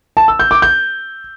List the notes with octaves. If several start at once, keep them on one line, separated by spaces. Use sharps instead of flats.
A5
E6
G6
D6
G6